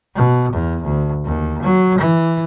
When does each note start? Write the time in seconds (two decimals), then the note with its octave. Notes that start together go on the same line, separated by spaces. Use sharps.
0.15 B2
0.53 E2
0.84 D2
1.25 D#2
1.62 F#3
1.98 E3